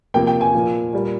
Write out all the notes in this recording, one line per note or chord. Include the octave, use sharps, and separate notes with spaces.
C3 F3 A#3 G5
G5
G#5
A#2 F3 A#3
A#2 G3 A#3